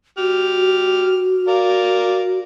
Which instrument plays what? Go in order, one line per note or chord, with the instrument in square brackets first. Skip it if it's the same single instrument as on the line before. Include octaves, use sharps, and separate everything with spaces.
[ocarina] F#4 [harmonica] G4 F6
[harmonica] A#4 D5 F5